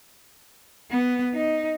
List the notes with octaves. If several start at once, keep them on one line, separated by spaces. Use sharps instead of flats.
B3
D#4